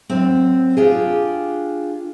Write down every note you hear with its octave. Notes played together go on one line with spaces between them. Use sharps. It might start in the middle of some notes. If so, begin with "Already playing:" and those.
F#2 C4
D4 F4 G4 G#4